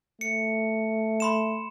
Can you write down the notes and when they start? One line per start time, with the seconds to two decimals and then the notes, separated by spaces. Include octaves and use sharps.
0.21 A3 C#7
1.20 B5 C6 E7